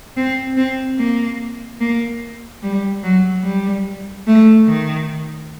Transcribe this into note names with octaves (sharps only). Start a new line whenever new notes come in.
C4
C4
A#3
A#3
G3
F#3
G3
A3
D#3